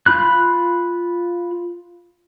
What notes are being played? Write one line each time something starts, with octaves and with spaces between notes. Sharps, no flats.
F4 B5 F#6